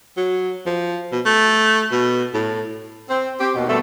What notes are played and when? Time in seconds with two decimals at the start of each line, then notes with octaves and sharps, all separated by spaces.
0.17 F#3
0.66 F3
1.12 B2
1.25 A3
1.91 B2
2.34 A2
3.09 C4
3.40 C4 G4
3.55 D#2 B2
3.69 G2 B2 D3 A3